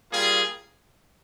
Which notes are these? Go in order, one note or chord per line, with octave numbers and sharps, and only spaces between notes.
G3 A#3 F4 G#4